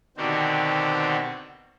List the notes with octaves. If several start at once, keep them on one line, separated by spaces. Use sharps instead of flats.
B2 D3 D#3 C4 F#4 G4